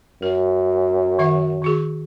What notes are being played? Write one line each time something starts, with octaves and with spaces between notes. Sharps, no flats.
F#2 A#4
D#3 E5 F#5
D#3 F#4 G#4